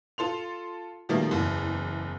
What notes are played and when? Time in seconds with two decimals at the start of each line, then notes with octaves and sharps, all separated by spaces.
0.18 F4 A4 C6 F7
1.09 B2 D#3 F3 G3 A3 A#3
1.31 F#1 E2